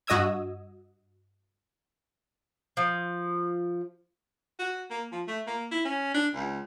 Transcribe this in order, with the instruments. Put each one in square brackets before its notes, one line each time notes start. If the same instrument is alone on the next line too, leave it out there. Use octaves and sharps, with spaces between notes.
[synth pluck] G2 F#4 D#5 D#6 E6 G#6
[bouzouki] F3
[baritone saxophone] F#4
A#3
F3
A3
A#3
E4
C#4
D4
C#2